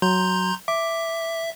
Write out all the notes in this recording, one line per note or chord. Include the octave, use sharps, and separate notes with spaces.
F#3 A#5 C6 G6
E5 D6